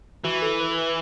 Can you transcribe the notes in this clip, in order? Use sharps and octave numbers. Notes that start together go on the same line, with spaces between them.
E3 F#4
A4
B4
B4